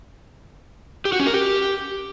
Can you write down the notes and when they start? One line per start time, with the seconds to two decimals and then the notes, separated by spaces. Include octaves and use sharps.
1.05 G4
1.12 F#4
1.20 C#4
1.27 A#4
1.34 G4